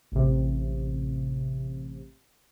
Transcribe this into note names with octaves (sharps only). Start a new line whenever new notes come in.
A1 C3